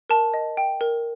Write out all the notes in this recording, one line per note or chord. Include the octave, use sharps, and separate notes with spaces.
A#4 A5
D#5
G5
A#4